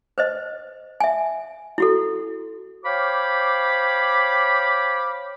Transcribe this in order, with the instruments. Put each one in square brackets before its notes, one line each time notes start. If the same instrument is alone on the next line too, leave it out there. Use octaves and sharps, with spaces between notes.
[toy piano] B4 C5 D#5
E5 G#5
E4 F#4 A4
[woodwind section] C5 C#5 F5 G5 B5 D6